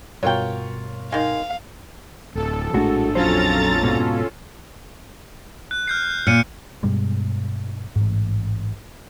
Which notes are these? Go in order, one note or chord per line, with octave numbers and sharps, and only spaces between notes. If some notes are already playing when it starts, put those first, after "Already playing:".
G2 B2 F#3 F4 A#4 C#5 G5
D#3 G#3 F5
D1 A4
A#1 A2 G#3 D4 F#4
F2 F#3 C#4 F4 A4 C5 A#5 A6
G#2 B2
F#6
F6 G6 C7
A#2 F6 C#7 D#7
G2 B2 G3 G#3
A1 G#2